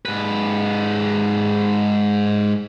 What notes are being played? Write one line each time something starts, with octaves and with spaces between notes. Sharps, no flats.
G#2 B4